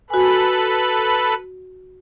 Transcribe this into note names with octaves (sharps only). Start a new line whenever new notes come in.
F#4 A4 B4 G#5 B5